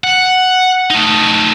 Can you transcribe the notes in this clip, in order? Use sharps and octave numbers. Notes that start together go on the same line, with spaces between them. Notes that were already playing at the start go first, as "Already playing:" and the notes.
F#5
A3 D#4